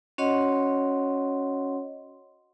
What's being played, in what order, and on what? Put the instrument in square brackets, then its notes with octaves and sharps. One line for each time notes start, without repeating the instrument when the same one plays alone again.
[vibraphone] C#4 F#4 C#5 D#5 F#5 C6